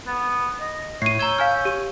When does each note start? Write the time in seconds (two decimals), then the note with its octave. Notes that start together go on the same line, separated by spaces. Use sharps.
0.07 B3
0.60 D#5
1.02 A2 C#5 C7 D#7
1.19 A#5 E6 G6 G#6
1.38 F5 G#5 F6
1.65 G4 D#7